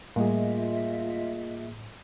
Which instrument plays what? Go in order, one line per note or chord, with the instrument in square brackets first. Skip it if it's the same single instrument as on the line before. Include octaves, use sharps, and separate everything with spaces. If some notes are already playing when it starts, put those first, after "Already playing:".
[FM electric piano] A2 [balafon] G3 [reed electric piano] A#3 G#4 [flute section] F4 D#5 E5